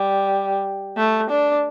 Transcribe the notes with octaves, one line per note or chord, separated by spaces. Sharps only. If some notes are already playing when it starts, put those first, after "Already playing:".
Already playing: G3
A3
D4